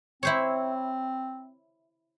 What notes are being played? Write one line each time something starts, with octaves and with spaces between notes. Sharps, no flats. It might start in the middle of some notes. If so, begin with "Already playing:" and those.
C4 E4 C5 C#5